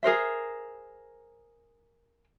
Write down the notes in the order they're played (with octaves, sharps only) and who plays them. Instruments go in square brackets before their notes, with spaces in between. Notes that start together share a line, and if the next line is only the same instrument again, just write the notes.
[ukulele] G#4 A#4 C5 E5